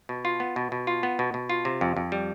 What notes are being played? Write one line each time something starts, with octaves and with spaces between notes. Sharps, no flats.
B2
F4
B3
B2
B2
F4
B3
B2
B2
F4
C3
F2
F2
G3